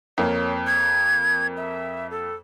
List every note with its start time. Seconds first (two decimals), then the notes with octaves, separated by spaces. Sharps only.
0.18 F2 A#3 C#5
0.67 G#6
1.57 E5
2.11 A4